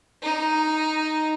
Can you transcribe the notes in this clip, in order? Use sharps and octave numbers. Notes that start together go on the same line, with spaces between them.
D#4